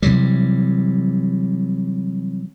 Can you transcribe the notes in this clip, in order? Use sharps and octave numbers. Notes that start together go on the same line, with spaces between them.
C3 E3 F#3 G3